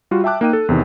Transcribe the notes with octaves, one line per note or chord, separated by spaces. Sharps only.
G3 F4 F#4
E5 G5 A5 D6 F#6
A#3 D#4 G5 D#7
A4
E2 C3 D#3